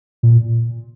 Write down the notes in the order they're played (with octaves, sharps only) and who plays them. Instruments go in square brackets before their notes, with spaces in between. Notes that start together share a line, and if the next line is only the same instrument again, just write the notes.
[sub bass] A#2